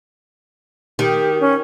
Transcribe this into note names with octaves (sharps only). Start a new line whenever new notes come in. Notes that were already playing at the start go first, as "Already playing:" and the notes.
D#3 G4
C#4